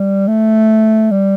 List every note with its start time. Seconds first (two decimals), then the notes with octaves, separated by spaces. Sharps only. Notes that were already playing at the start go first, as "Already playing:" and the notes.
Already playing: G3
0.28 A3
1.11 G3